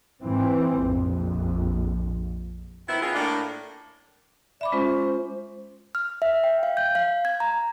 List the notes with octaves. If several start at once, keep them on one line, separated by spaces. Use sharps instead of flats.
G#2 E3 C4
A#1 F2
D#3 B3 C4 E4
D#3 B3 C#4 D#4 F4 G#4
A2 A#3 D4
D5 E5 B5 D6
G#3 C#4 F4 C5
F6
E5
G5
F5
G6
F5
G#6
A#5